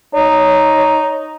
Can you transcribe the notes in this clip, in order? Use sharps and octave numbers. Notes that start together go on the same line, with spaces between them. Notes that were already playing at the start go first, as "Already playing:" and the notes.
D#4 C#5